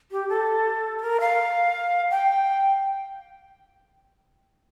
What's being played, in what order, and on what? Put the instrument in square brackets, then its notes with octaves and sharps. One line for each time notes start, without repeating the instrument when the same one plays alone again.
[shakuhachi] G4
A4
A4
A#4
F5
G5